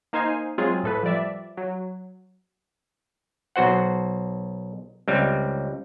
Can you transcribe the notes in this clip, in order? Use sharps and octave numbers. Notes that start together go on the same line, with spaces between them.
A#3 D#4 C5 F5 G#5
F#3 G#3 C4 F4 G#4
A2 A4 B4
F3 G3 D5 E5
F#3
B1 F#4 C5 F#5
C#2 G3 C4